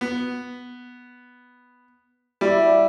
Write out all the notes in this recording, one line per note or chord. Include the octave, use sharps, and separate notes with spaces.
B3
G3 E4 D5